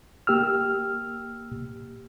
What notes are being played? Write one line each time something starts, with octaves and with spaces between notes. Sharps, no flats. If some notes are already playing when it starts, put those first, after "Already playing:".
A#3 G4 E6 F6